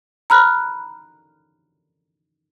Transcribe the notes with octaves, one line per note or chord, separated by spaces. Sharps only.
A#5 B5 F6 F#6